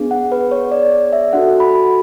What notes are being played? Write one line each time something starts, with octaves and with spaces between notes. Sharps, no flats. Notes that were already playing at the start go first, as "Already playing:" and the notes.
Already playing: B3 D4 G#4
F#5
B4
C#5
D5
D5
E5
D4 F#4 A4 F#5
B5